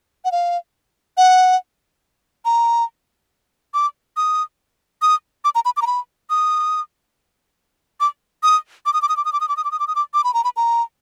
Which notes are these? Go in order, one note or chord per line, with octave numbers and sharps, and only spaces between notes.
F#5
F5
F#5
A#5
D6
D#6
D#6
D6
A#5
B5
D6
A#5
B5
D#6
D6
D#6
D6
D#6
D6
D#6
D6
D#6
D6
D#6
D6
D#6
D6
D#6
D6
D#6
D6
D6
B5
A#5
B5
A#5